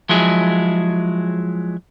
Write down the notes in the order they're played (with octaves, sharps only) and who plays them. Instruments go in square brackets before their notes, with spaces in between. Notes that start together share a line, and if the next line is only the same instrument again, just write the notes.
[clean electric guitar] F3 F#3 G#3 E4 G#4